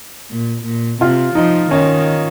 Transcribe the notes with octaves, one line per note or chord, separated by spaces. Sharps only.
A#2
A#2
C3 F4
F3 D#4
D#3 C#4